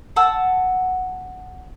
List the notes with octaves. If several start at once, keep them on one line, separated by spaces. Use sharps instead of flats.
F#5 A5 E6